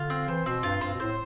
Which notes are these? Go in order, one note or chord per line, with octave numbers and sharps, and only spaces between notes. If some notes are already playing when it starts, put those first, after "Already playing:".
Already playing: D3 F4
C4
E3 C5
B2 C4
G2 F4
G2 C4
B2
A2 C5